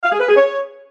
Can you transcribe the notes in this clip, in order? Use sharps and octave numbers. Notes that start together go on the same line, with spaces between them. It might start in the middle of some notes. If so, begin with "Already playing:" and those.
F5
G#4
B4
G#4
C#5